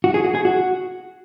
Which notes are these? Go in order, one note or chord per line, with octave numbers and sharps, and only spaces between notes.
F#4
G#4
F#4
G#4
F#4